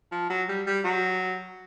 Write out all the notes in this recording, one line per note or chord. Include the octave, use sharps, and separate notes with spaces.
F3
F#3
G3
G3
F#3